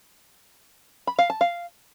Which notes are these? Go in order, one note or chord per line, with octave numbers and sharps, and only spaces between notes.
B5
F5
A5
F5